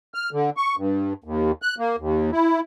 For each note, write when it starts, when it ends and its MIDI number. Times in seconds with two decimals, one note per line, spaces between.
0.14 0.30 89
0.32 0.50 50
0.57 0.76 85
0.77 1.13 43
1.24 1.52 39
1.62 1.75 90
1.79 1.96 58
1.98 2.31 39
2.32 2.60 64